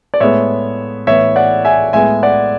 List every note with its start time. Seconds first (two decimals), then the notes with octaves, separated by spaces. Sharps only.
0.14 D5
0.20 A2 G#3 B3 C#5 E5
1.07 A2 E3 B3 C#5 E5
1.36 D5 F#5
1.65 E5 G#5
1.93 A2 G#3 B3 E5 G#5
2.23 D5 F#5